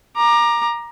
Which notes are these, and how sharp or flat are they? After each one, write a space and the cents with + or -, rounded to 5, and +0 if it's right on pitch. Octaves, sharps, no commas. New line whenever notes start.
A#5 +10 D6 +25